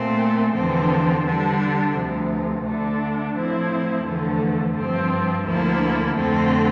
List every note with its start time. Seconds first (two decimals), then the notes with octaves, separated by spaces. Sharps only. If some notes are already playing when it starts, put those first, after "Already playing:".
Already playing: A#2 A3 C4
0.55 E2 D3 F3 C4
1.25 D3 G3 D4
1.95 D2 C3 F3
2.65 D3 A3 D4
3.35 A2 F3 C4 E4
4.05 E2 D3 F3 A3
4.76 G2 F3 C4
5.46 D2 D3 F3 A#3 E4
6.16 F2 D3 A3 C4